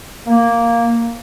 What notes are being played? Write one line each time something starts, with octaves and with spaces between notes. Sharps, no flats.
A#3